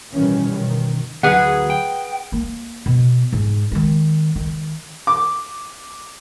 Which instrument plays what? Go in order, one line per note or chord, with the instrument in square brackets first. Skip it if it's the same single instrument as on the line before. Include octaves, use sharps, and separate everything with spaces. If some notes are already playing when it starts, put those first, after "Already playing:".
[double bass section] A1 B2 D#3 E3 G3 C#4
F#2 B2 D#3
[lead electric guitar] D2 F#3 [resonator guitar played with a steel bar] G#4 B4 F#5
[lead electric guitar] G5
[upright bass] A#3
B2
G#2
D#3 G#3
D#3
[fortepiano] D6